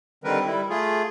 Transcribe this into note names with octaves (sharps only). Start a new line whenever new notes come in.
D3 D#3 G3 C4 A#4 B4
G3 E4
A3 F4 G#4